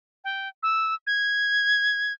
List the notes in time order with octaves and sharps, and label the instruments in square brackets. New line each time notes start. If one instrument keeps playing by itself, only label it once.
[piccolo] G5
E6
G#6